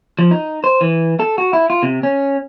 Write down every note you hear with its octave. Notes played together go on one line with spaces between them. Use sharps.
F3
D#4
C5
E3
A4
F#4
E4
F4
C3
C#4